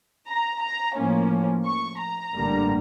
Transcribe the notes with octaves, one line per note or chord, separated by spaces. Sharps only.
A#5
A#5
A2 F3 A#3 C#4
C#6
A#5
A1 G2 D3 G3 A#3